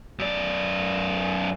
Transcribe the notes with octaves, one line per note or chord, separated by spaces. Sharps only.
F#2 D5